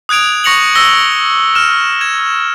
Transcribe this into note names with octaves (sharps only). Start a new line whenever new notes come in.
D#6 F#6 G#6 D7 F7
C#6 A#6 C#7 F7 F#7
E6 A#6 G7
F6 E7
G#6 E7